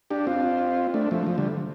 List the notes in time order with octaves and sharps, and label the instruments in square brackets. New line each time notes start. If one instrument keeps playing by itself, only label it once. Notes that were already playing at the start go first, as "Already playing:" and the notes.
[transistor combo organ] D4 G4
C4 F4
A3 D4
F3 A3
F3
D3 G3